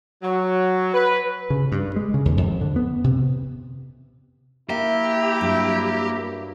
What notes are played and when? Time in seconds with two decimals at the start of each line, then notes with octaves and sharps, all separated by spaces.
0.23 F#3
0.94 B4
1.50 C#3
1.72 G2
1.96 G#3
2.14 C#3
2.25 D#2
2.37 F2
2.61 D3
2.76 B3
3.04 C3
4.70 A#3 E4 G4 E5
5.41 G2 F#3